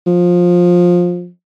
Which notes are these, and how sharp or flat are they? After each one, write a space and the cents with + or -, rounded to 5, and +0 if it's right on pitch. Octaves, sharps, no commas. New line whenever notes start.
F3 +15